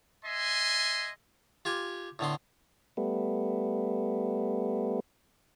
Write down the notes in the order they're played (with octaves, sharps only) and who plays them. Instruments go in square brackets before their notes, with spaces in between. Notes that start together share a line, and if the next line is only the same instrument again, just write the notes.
[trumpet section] D#5 E5 G#5 C6
[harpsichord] F4 G4 G#5
A2 D3 B3 C6
[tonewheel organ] G3 A3 B3